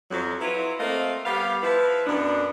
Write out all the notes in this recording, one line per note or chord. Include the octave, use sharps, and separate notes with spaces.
F2 F#3
F#3 E4 F4 B4
A3 A#3 C4 D#5 F5
G3 B3 G4 F5
F3 E4 B4
F#2 B2 B3 D4